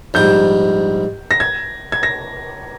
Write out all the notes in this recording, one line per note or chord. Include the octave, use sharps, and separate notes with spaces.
A#1 G#2 G3 G6
A#6
G#6
G#6
A#6